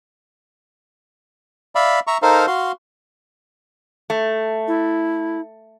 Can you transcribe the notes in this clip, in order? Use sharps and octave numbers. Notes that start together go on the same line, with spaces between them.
D5 E5 F5 B5
E5 A#5 C#6
D#4 A4 A#4 C5 F5
F#4 F5 C6
A3
E4